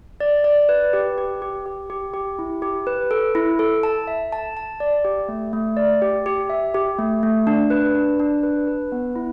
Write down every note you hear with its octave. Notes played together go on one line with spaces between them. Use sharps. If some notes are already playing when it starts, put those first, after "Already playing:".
D5
D5
B4
G4
G4
G4
G4
G4
G4
E4
G4
B4
A4
E4
A4
A5
E5
A5
A5
D5
G4
A3
A3
D5
G4
G4
E5
G4
A3
A3
D4
B4
D4
D4
B4
B4
B3
E4